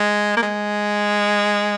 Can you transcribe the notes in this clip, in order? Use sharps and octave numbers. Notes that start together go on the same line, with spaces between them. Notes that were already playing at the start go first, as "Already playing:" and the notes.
Already playing: G#3
A#3
G#3